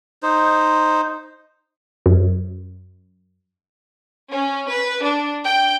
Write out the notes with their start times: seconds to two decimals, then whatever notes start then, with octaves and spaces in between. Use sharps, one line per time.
0.23 D#4 C5
2.06 F#2
4.31 C#4
4.69 B4
5.04 D4
5.45 G5